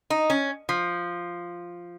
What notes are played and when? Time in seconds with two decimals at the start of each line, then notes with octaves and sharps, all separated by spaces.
0.10 D#4
0.30 C#4
0.69 F3